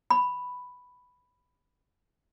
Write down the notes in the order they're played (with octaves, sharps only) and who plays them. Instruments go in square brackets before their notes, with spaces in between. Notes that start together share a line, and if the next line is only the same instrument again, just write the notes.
[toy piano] B5